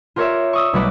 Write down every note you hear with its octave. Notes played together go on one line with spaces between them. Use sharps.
F4 G4 A#4 C#5 D5 E5
C#6 D#6 E6
B1 G3 A3 F#4 B4 D6